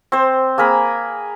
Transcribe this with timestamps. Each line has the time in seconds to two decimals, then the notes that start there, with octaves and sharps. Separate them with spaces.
0.12 C4 C5
0.58 A#3 G#4 A#4 B5